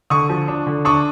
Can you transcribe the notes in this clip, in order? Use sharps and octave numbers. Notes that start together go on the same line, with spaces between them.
D3 C#6 D#6
F3
D4
D3
D4 C#6 D#6